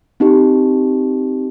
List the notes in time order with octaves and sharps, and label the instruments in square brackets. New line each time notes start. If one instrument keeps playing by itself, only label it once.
[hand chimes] C4 D#4 G4